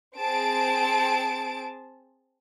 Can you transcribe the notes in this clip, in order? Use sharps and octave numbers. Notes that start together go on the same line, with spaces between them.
C4 G#4 A5 D7